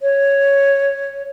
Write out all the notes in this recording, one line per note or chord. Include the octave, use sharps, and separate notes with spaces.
C#5